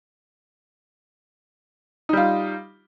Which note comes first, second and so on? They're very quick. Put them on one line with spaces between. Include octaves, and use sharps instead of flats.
D#4 G3 F4